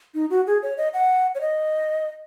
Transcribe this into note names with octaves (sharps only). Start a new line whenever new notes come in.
D#4
F#4
G#4
C#5
D#5
F#5
C#5
D#5